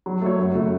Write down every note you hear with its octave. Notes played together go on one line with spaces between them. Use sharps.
F#3
A3 F#4 C#5
F#2
C#3 A3 F#4